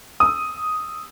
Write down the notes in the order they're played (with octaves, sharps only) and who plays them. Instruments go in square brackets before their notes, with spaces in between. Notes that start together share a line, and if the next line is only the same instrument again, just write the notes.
[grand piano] D#6 E6